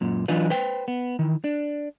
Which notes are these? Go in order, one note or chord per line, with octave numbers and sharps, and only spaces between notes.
F#2 A#2
E3 F#3 D4 D#4 F4 B4
B4 C5 G5
B3
D#3 E3
D4